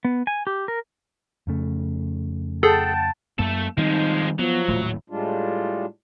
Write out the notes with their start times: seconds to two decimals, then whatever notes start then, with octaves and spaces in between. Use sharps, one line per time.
0.05 B3
0.27 G#5
0.47 G4
0.68 A#4
1.47 F2 C#3 A3
2.63 G#4 A4 F#5 G5 A5
3.39 F#2 A3 A#3 A4
3.77 D#3 F3 G3 G#3 C4 D#4
4.39 F3 F#3 B3
4.68 D#1 A2 A3
5.10 A2 G3 G#3 D4 F4